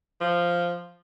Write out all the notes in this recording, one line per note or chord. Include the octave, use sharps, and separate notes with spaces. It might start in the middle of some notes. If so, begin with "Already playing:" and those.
F3